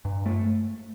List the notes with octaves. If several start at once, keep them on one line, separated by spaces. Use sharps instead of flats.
G2
A3